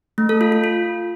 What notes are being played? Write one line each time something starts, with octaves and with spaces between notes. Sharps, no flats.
A3
A4
F4
F4
F4